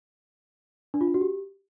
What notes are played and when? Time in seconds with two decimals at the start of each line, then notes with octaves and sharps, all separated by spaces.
0.94 D4
1.01 F4
1.08 D4
1.14 F#4
1.21 G4